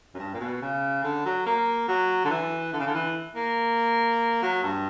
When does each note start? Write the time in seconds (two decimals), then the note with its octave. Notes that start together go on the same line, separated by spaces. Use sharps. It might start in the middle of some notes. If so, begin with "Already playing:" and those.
0.14 F#2
0.19 G2
0.34 A#2
0.40 B2
0.62 C#3
1.04 D3
1.25 F#3
1.46 A#3
1.88 F#3
2.24 D3
2.30 E3
2.73 D3
2.79 C#3
2.87 D3
2.94 E3
3.35 A#3
4.42 F#3
4.63 G2